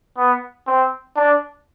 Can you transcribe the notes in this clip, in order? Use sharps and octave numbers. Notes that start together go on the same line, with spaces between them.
B3
C4
D4